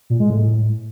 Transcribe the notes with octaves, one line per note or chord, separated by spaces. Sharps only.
A#2
G#3
A2